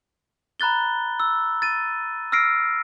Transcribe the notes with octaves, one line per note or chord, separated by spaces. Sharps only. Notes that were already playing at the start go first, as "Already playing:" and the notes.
A#5 B5 F#6 A6 G7
E6
A6 D#7
E6 F6 A#6 C7 D7